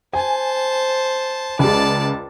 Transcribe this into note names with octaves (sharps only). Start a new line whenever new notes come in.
C5 G#5 A5
C#2 G#3 D5 A5